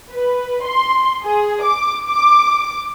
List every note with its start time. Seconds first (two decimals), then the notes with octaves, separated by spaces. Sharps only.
0.10 B4
0.64 C6
1.24 G#4
1.63 D6
2.08 D6